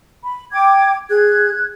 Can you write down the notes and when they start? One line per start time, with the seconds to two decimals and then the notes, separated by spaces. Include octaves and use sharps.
0.24 B5
0.53 G5 D6 G#6
1.10 G#4 F#6 G#6